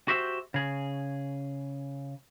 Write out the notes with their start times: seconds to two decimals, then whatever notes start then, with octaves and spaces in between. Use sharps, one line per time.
0.08 F#4 G4 C5 E5
0.54 C#3 G#4